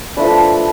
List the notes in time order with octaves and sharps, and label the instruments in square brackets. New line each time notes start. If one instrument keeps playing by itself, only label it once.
[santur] F3 A3 D4 B4